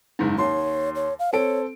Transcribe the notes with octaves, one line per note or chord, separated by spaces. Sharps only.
F#1 G#2
D#2 C#5 C6
C#5
F5
C4 A4 C#5 D7